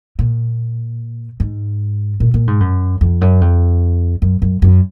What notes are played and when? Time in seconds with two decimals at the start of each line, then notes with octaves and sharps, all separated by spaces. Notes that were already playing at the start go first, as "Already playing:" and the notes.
0.19 A#2
1.40 G#2
2.20 A#2
2.34 A#2
2.47 G#2
2.60 F#2
3.01 F2
3.21 F#2
3.41 F2
4.22 F#2
4.42 F#2
4.62 F#2